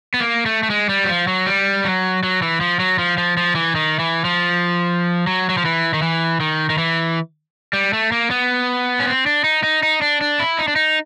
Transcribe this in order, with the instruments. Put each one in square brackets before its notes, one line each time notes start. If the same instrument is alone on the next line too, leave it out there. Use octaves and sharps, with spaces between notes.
[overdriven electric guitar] B3
A#3
A3
A3
G#3
G3
F#3
F3
F#3
G3
F#3
F#3
E3
F3
F#3
F3
F3
F3
E3
D#3
E3
F3
F#3
F#3
F3
E3
D#3
E3
D#3
D#3
E3
G3
A3
A#3
B3
C#4
C4
D4
D#4
D#4
D#4
D4
D4
E4
D#4
D4
D#4